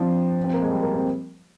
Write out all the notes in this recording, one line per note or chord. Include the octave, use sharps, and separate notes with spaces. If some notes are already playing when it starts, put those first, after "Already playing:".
Already playing: F3 C4 D4
C4
A#3
G#3
G3
A#3
C4